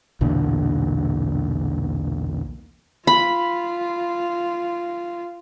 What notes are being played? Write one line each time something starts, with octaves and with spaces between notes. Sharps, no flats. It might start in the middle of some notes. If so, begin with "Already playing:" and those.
B1 E2 A#2 D3
F4 B5